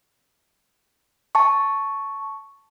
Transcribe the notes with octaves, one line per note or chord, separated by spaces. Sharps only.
A5 C#6